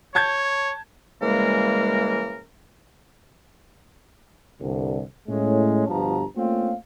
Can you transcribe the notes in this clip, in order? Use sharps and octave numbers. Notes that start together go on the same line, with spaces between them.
C#5 A5 G6 G#6
C#3 E3 G3 G#3 A#3 A#4
C2 G2 D3
A2 G#3 C#4
G1 G2 B2 F3 A5 A#5
A3 A#3 C4 C#4 F4 F5